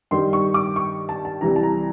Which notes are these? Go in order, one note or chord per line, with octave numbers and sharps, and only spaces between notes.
G2 D#3 G3 C6
C#6
D6
C#6
A5
A5
C2 C3 E3 G3 A#5
A5
A#5